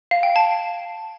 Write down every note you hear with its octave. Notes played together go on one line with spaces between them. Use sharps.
F5
G5
A5